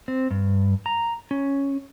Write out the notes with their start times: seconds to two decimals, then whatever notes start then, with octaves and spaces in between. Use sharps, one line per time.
0.08 C4
0.31 G2
0.86 A#5
1.31 C#4